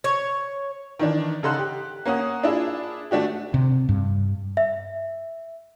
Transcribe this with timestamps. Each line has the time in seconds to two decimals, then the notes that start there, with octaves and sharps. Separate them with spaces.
0.04 C#5
0.99 D#3 E3 D4
1.43 C#3 D#4 A4 F#5 C6 F#6
1.58 G4
2.05 A#3 C#4 F#5 D#6
2.43 D4 E4 F4 G#4
3.11 A3 D4 F#4 G4
3.54 C3
3.89 G2
4.57 E5